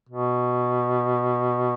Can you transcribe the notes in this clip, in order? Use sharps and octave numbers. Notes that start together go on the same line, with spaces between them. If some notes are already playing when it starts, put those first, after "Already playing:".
B2